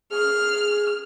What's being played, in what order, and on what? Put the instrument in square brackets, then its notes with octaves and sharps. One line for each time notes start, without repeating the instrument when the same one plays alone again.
[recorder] G#4 [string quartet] F6